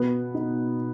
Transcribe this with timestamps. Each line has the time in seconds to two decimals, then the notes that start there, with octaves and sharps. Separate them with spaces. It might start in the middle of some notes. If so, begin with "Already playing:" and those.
Already playing: B2 B3
0.34 D#4